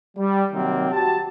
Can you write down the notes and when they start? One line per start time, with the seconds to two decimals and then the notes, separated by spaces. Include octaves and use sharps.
0.17 G3
0.52 C3 D#3 F#3 A#3 C4
0.92 F#4 G4 A5